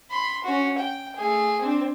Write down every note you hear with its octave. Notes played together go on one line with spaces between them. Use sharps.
B5 C6
C#4 F#4
G5
A3 G#4
C4 D4